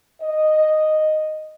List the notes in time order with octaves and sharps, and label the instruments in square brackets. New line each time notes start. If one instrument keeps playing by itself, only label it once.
[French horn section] D#5